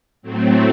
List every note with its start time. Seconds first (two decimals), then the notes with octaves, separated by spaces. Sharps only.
0.22 A2 F#3 A3 C4